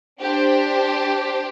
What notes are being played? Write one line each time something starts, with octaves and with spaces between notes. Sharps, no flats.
D4 G4 C5